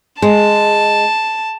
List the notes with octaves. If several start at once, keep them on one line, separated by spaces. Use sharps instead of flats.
G#3 A5